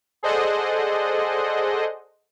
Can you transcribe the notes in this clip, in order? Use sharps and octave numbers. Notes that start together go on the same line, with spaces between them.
G#4 A4 C5 D5 D#5 F#5